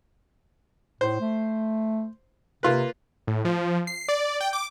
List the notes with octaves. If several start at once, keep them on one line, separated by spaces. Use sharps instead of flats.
A2 C5
A3
C3 A#3 F4 B4
A2
F3
C7
D5
G5
D6